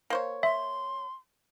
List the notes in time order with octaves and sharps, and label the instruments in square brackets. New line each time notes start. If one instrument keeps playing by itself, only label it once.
[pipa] A#3 C5 C#5
[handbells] E5 [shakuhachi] C6